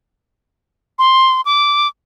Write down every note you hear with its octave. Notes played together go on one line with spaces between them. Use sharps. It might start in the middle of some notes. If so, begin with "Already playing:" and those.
C6
D6